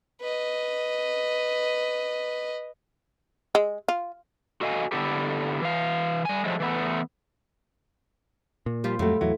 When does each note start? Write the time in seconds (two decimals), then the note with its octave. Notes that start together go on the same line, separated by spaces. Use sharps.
0.21 B4 D#5
3.55 G#3
3.88 F4
4.61 F#4 A4 D#5 F5 G#5
4.92 D3 B3 E4 G4 A4
5.62 E3 F5
6.25 G3 G#5
6.45 F3 F#3 G#3 A3
6.60 E3 A3 B3
8.66 A#2
8.84 F3 G3 F4 G4 G5
8.99 F2 A2 F#3 G3 A3
9.21 E2 E3 F#3 E4